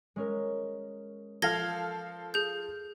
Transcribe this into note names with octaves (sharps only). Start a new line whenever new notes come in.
G#3 C#4 A#4
F3 A4 F5 G#6 A#6 G7
G#4 G6